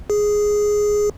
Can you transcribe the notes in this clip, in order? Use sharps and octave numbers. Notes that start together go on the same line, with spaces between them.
G#4